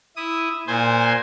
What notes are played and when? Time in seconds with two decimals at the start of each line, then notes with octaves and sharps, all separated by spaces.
0.16 E4 D#6
0.67 A#2 C5 G#5